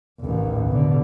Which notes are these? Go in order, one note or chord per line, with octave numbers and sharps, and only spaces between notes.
A1 D#2
B2 D3